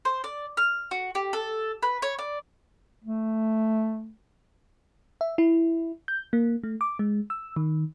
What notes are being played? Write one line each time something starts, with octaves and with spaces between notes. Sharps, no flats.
C5
D5
F6
F#4
G4
A4
B4
C#5
D5
A3
E5
E4
G6
A#3
A3
D6
G#3
E6
D#3